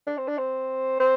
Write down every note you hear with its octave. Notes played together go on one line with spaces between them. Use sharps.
D4
C4
D4
C4
C4